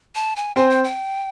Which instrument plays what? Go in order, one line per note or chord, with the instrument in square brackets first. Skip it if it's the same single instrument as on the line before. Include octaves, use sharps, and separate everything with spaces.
[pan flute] A5
G#5
[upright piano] C4 C5 [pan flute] G#5
[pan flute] G5
G5